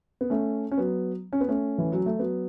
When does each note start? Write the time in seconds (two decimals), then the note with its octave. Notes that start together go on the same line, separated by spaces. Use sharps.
0.21 B3
0.30 A3 C#4
0.71 C#4
0.78 F#3 B3
1.33 C#4
1.41 B3
1.48 A3 C#4
1.78 E3
1.92 F#3
2.06 A3
2.19 F#3 B3